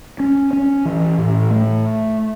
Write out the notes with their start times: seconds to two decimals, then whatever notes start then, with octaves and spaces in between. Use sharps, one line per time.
0.20 C#4
0.53 C#4
0.85 E3
1.18 A2
1.50 A3